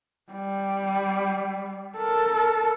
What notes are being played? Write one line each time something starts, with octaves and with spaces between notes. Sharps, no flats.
G3
A4 A#4